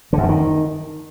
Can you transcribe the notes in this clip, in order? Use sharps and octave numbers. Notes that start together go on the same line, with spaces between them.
D3
F#2
D3
D#3